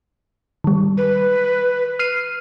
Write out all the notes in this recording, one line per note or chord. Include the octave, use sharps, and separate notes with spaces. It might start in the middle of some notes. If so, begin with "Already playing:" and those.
D#3 G3
B4
F6 C7 D#7